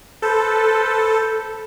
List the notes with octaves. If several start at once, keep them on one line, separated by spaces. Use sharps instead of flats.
A4 B4 C5